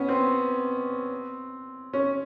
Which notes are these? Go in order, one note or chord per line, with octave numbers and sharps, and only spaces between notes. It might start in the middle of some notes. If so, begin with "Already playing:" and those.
Already playing: B3 C#4
C4
C#4